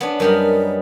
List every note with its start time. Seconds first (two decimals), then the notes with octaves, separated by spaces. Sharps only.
0.01 B3 C#4 D4
0.20 F#2 G3 A#4 D#5